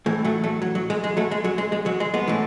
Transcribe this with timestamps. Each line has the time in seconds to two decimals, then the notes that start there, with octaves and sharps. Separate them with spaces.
0.06 A2 E3 G#3
0.24 F#3 A3
0.44 F#3 A3
0.62 F#3
0.75 F#3
0.90 G#3
1.04 G#3
1.17 F#3 A3
1.31 G#3
1.44 F#3
1.58 G#3
1.72 G#3
1.86 F#3
2.00 G#3
2.14 G#3 B3
2.28 A2 E3